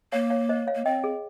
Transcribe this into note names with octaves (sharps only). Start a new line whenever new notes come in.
A#3 C#5 F5
C#5 F5
C5 D#5
C#5 F5
A#3
C4 D#5 G5
G#4